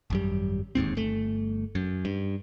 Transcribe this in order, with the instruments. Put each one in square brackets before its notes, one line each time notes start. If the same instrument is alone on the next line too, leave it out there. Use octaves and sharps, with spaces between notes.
[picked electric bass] G#1 F#2 G3
D1 D#2 G#2 C4
G1 A3
F#2
G2